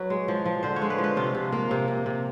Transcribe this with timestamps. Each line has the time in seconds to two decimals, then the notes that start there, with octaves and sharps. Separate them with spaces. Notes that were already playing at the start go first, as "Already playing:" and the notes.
Already playing: F#3 B4
0.10 G#3
0.28 F3
0.46 F3
0.63 D3 C5
0.76 C#5
0.82 G#3
0.90 B4
0.98 F3
1.04 B4
1.17 C3 F4
1.34 C3
1.52 A#3
1.71 C3
1.88 C3
2.06 C3